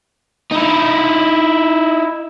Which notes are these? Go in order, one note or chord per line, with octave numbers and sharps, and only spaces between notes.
D#4 E4